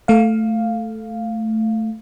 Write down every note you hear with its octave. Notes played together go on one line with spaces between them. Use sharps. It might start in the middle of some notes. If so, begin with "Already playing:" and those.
A3 F5